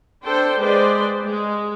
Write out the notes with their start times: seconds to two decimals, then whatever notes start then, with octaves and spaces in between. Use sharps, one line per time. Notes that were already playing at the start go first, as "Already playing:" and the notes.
0.24 D4 A4 C5 G5
0.58 G#3 B4 C5 D5 G5
1.25 G#3